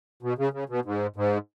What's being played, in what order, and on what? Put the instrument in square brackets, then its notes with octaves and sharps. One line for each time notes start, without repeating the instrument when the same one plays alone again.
[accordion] B2
C#3
C#3
B2
G#2
G#2